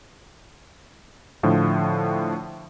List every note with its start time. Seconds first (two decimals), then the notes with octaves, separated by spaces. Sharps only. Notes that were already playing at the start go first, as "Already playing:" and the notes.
1.43 A2 D3 F3